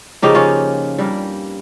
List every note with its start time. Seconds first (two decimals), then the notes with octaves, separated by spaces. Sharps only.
0.22 C#3 F3 A#3 D#4 G4
0.35 C#4 F4
0.98 G2 G3 A#3